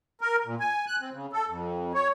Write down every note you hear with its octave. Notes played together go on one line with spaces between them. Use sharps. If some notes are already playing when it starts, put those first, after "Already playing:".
A#4
A#2
G#5
F#6
C4
C#3
A4
F2
C#5